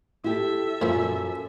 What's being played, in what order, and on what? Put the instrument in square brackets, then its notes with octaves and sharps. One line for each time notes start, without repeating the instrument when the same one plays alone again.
[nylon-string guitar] E4 G4 [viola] A4 E5
[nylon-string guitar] F#2 [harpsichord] A#2 F3